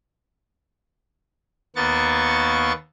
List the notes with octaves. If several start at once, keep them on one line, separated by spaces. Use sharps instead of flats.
D#2 A#3 B3 C#6 A6